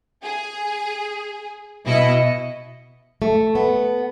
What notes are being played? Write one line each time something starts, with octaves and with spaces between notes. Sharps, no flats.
G#4
B2 E4 D#5 C#7
A3
B3